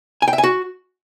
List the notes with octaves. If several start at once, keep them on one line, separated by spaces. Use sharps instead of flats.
G#5
G5
E5
G#5
F#4